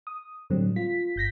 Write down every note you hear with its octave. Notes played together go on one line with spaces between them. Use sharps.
D#6
A2 D3 F#3 G3 C4
F4 B6
G1 G6 A#6 B6